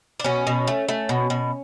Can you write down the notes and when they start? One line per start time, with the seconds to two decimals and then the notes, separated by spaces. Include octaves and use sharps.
0.20 D4
0.24 B2 C#4
0.47 B2
0.67 A3
0.89 A3
1.09 B2
1.30 B2